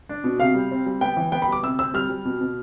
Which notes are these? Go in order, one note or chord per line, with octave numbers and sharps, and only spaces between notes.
D4
B2
C3 F5
G3
C4
G3
B3 G5
E3
B3 G5
B5
G3 D6
C3 E6
C4 E6
G3 F6
G3
B2
B2